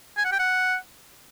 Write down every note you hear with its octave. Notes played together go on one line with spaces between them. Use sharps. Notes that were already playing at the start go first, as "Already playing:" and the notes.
G#5
F#5
G5
F#5